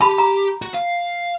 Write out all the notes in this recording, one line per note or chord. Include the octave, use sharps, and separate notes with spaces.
G4 A5 B5
A#5
F#4
F5